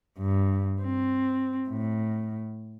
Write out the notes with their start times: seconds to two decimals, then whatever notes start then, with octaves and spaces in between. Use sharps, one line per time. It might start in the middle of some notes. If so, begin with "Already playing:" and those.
0.19 G2
0.82 C4
1.69 A2